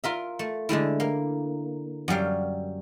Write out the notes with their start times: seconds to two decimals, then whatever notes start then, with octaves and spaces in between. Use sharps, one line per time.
0.04 F4 A#4 E5
0.39 A3
0.69 D3 G#3 A3 E4
1.00 A#3
2.08 F#2 F#3 G3 F5